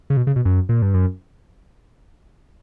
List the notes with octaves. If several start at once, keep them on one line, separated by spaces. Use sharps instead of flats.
C#3
B2
C#3
B2
F#2
A#2
G2
F#2